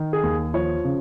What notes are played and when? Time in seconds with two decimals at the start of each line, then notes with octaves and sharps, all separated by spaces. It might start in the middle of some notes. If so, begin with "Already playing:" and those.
Already playing: D#3
0.13 G#4
0.23 D#2
0.54 F3 C#5
0.84 C#3